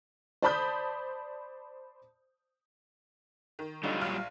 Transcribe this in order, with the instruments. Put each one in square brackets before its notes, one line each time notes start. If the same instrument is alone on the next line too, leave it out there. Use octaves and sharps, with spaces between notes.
[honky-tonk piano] C5 D5 A5 B5 D#6 G6
D#3
[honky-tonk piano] D3 D#4 [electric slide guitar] F#3 G3 F4
[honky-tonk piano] A#1 F5 F6